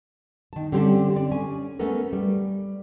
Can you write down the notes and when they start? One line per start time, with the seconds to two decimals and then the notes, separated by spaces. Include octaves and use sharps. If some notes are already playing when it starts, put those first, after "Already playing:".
0.53 D#3 A5
0.72 D3 G3 C4 C#4 G4 A4
1.16 D5
1.31 C#4 G#5
1.79 A3 B3 C#4 A4 A#4
2.13 G3